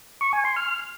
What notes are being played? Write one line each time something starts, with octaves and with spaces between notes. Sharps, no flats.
C#6
G#5
C6
F6